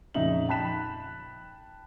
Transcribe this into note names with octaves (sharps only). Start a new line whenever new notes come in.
F2 A#2 C#3 D#4 E5 F#7
G5 A5 B5 F#6 B6 E7